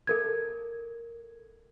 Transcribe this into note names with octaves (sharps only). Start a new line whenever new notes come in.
A4 A#4 G#6